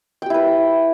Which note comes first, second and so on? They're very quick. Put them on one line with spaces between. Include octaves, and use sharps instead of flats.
G5 G4 E4 B4